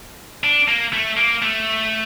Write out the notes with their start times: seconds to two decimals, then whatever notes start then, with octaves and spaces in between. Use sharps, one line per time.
0.44 D4
0.68 A#3
0.93 A3
1.17 A#3
1.42 A3